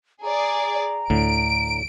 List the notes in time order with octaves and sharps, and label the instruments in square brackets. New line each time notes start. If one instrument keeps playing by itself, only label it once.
[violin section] G#4 D5 [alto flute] A#5
[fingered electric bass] D2 [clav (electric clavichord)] A2 D3 [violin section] D7